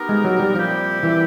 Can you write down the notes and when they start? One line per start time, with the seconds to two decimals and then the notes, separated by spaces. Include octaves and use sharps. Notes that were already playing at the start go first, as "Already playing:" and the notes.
Already playing: B3 D#4 G4 A#4
0.09 G#3
0.25 F#3
0.40 G3
0.56 A#2 F3 G3 C4 E4 G4
1.03 E3